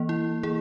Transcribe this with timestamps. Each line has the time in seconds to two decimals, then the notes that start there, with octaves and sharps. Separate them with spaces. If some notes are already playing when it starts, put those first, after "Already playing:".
Already playing: E3 A#3
0.09 E4
0.43 E3 A#3 E4 G#4